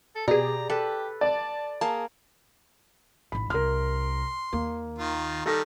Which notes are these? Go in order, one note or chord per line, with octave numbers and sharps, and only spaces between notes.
A4
B2 G4 G#4 D5 A#5
G4 A4 B4
D5 A5
A#3 G#4 A5
A1 G#2 B5
C2 A#4 C6 F6
D#2 A#3
D#3 F4
D#3 G3 A4 A#6